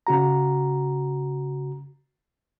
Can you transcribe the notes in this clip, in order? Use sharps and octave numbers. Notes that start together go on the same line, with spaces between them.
C#3 F#4 A#5